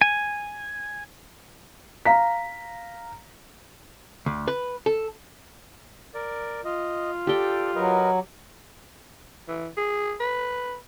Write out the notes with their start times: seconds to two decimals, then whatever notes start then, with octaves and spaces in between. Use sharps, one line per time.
0.01 G#5
2.05 F5 A#5 B6
4.26 D2
4.48 B4
4.86 A4
6.14 A#4 D5
6.65 F4 D#5
7.27 G4 A4 D5 G5
7.75 F#3 A#4 B4 D#5
9.48 E3
9.77 G#4
10.20 B4